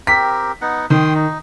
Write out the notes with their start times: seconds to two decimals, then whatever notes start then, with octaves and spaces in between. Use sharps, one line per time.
0.07 C4 G4 A#4 B6
0.61 B3 D#4 F#5
0.90 D#3 G5 C6 D#6
1.15 D#4